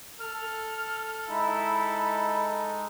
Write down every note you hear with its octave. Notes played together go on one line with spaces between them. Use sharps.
A4 F6
G#3 D#4 E4 B5